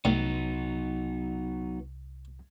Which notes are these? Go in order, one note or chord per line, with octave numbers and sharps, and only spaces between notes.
C2 A2 F#3 B3 D#4